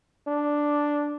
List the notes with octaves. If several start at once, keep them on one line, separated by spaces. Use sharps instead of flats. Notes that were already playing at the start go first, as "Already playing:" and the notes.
D4